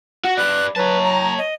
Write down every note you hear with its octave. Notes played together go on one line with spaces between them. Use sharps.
F#4 F#5
B4 D5 F#6
F#3 B4 C#5 A5
A#5
D#5